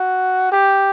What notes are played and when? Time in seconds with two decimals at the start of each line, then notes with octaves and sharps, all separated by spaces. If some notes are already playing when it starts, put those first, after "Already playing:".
Already playing: F#4
0.52 G4